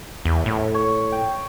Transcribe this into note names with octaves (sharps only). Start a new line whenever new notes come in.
E2
A2
C#5
G5